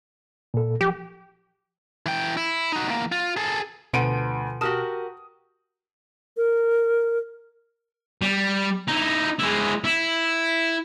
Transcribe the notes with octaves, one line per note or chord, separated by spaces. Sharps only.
A#2 A4
F3 G4
E3 G5
E4
D#4 F#4
E2 A#3
F4
G#4 A4
D2 B2 F3 B4 F#5 D7 D#7
F#4 G4 A#4 A5 D#6 F6
A#4
G3
D#4 E4
G#3 E4
E4